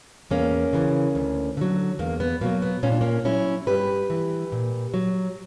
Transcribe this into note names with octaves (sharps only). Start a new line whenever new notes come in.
E2 A#3 C#4
C#3 E3
D2
D3 F#3
E2 A#3
B3
B2 F#3 A#3
B3
A#2 C#4
D4
A#3 C#4
F#3 C#4 E4
G2 G4 B4
E3
A#2
F#3